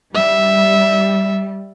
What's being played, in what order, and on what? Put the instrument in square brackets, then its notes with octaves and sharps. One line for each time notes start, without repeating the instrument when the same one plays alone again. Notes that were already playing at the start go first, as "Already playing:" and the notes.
[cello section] G3 [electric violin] E5